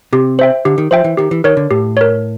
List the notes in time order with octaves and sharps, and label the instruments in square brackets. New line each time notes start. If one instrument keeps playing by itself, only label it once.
[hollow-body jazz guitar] C3 [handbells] G4
[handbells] C5 E5 G5
[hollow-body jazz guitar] D3 [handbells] G4
[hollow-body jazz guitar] D#3
[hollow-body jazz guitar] F3 [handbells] C5 E5 G5
[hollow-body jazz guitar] E3
[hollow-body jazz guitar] D#3 [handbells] G4
[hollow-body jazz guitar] E3
[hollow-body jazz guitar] D#3 [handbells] A#4 C#5
[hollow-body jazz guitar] D3
[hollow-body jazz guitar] A2 [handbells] G4
[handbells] A#4 C#5